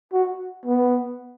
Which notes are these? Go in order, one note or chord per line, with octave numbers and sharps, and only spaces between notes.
F#4
B3